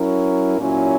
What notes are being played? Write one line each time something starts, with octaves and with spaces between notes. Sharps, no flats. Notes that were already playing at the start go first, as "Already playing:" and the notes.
Already playing: F#3 C#4 E4 A#4
A#2 F#3 C#4 E4